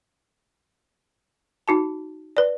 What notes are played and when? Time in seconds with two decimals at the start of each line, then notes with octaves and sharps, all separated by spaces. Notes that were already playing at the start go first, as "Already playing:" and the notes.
1.68 D#4 F#4 A5
2.37 B4 D5